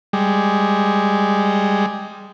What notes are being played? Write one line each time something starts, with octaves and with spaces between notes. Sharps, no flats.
G3 G#3